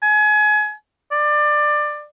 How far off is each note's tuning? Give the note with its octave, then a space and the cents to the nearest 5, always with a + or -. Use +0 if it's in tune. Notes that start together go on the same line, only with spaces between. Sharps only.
G#5 +30
D5 +20